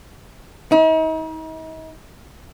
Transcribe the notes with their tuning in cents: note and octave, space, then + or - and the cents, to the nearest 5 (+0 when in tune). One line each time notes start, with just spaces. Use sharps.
D#4 +40